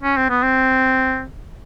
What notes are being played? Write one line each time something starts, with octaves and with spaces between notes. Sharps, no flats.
C#4
C4
B3
C4